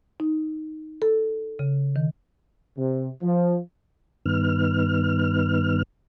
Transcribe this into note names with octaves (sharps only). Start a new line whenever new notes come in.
D#4
A4
C#3
D#3
C3
F3
G2 D#3 B3 F6